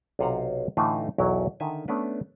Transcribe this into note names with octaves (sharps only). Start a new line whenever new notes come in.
B1 C3 F4 C5 F#5 A#5
A2 D3 E3 A3 D#4 F4
B1 E2 F#3 E4 A#4
D3 D#3 E5 G#5
A3 B3 C#4 D4 B4